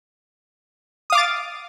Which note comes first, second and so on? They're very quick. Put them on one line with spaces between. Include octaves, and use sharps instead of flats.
D#6 F5 D6 A6